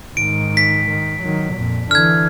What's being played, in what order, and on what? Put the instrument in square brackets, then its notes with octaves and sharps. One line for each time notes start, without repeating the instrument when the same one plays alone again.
[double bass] G#2 D#3 [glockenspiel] D7
[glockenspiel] B6
[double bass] D#3
D#3 F#3
F2 A#2
[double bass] D3 E3 [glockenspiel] F6 G#6